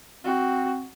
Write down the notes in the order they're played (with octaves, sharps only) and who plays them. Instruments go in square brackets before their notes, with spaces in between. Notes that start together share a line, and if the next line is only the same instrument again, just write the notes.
[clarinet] C4 [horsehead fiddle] F#4